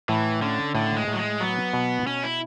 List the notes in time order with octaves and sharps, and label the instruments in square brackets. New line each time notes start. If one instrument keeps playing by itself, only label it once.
[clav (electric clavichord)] A2 [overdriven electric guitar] E3
[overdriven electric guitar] D3 [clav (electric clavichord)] C#4
[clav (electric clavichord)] A2 [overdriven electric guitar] D3
[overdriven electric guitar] G#3
[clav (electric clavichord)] A2
[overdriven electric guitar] F#3
G#3
[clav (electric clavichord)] F#3 [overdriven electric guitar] B3
[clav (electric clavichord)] B2
[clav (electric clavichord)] B2 [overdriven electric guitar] C#4
[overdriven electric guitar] E4